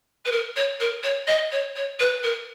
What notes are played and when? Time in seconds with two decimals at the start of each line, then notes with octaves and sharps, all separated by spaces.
0.25 B4
0.31 A#4
0.56 C#5
0.80 A#4
1.03 C#5
1.27 D#5
1.51 C#5
1.75 C#5
1.99 B4
2.23 A#4